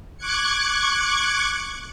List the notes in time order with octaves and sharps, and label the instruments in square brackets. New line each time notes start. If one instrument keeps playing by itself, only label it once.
[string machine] C#6 D6 F#6 G#6 C#7